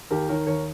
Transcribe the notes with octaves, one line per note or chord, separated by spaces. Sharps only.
D#2 G4 A#4
D#3 A#4 C#5
D#2 A#4 C#5